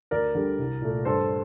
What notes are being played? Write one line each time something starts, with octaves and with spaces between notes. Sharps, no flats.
D2 A#4 D5
D3 G3
C2
A#2 A3
G2 A4 C5